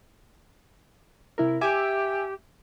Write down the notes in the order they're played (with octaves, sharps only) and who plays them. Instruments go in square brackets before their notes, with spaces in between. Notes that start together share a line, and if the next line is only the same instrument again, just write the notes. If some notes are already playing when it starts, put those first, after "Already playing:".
[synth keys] C3 E4 A#4
[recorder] G4 [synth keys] E5 G#5 D6